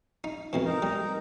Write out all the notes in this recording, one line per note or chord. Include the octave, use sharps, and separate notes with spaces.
D#4
F2 B2 E3
D#4 A#4
G3